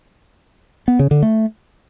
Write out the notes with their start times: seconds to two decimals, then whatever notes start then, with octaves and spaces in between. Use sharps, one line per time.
0.88 B3
0.99 C#3
1.11 D3
1.23 A3